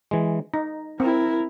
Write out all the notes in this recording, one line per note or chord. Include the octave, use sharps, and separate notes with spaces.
E3 G#3
D#4 A#5
C4 E4 A#4